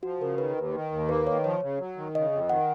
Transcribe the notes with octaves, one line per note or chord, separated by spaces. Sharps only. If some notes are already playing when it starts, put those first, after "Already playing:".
F3 F#4
C#3 A#4
D#3 B4
D#2
D#3
D#2
A#3 B4
D#3 C#5
F3 C#5
C#3
F#3
D#3
C#3 D#5
F2
D#3 F#5